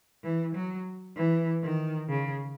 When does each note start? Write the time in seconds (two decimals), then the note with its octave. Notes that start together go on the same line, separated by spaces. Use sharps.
0.23 E3
0.55 F#3
1.16 E3
1.63 D#3
2.09 C#3